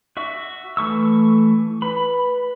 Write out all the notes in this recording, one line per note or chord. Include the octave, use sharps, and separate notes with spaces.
F#4 E5 C#6
E3 A3 C#6 E6
B4 B5